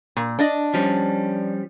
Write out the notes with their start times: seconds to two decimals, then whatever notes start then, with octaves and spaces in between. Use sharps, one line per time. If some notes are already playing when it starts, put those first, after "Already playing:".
0.17 A#2
0.39 D4 D5 D#5
0.74 F3 G3 C#4